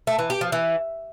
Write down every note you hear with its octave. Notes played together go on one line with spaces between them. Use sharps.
A3
E3
G4
F3
E3